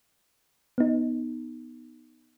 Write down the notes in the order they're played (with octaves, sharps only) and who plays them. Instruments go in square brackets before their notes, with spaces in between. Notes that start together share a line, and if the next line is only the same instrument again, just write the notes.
[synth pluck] B3 D#4